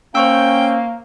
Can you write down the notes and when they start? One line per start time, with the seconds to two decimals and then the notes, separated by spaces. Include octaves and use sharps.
0.15 A#3 C#4 C5 G5 C#6 E6